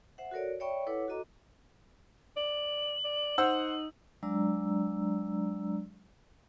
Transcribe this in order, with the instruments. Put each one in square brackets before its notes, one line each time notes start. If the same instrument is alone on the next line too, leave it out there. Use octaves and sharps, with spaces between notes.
[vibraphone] C5 E5 F#5
F#4 A4 A#4 C#5 D5
C#5 D5 E5 G5 B5 C#6
E4 A4 B4 C#5 F#5 D6
F#4 A4 D#5 A#5 D6
[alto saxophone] D5 [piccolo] F#7
[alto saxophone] D5
[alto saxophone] D#4 [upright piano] C5 F#5 E6
[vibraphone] F#3 G#3 D4 D5 A#5 E6